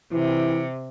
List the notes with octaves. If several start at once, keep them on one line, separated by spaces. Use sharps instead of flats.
C3 E3